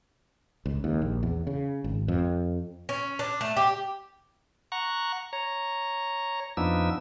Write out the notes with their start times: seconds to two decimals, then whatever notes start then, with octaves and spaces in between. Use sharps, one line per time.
0.66 C#2
0.84 D#2
1.02 A#1
1.23 E2
1.47 C#3
1.84 G#1
2.08 F2
2.89 C#4
3.19 D4
3.41 A3
3.57 G4
4.72 F#5 A#5 C#6
5.33 C#5 A#5
6.57 F2 F3 B3 D4 D#4 E6